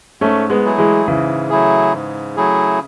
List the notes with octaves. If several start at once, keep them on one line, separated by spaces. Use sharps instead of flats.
G#2 A3 C#4
G#3 B3
F#3 A3 E4 G#4
E3 G#3
G#2 C#3 E3
F#3 A3 E4 G#4
G#2
F#3 A3 E4 G#4